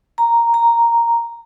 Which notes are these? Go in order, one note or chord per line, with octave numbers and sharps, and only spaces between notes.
A#5
A#5